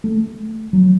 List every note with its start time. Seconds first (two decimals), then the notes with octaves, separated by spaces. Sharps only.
0.04 A3
0.73 F#3